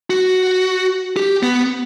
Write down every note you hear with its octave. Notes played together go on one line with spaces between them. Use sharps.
F#4
G4
B3